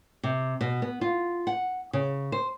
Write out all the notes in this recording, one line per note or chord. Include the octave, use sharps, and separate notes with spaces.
C3
B2
B3
F4
F#5
C#3
C5